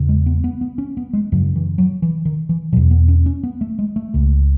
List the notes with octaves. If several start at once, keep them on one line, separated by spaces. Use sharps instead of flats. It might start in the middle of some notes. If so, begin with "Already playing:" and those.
Already playing: E2 C#3
G#3
B3
B3
B3
C#4
B3
G#3
F#2 C#3 F#3
E3
F#3
E3
D#3
E3
E2 B2 F#3
B3
C#4
C#4
B3
A3
G#3
A3
C#2 C#3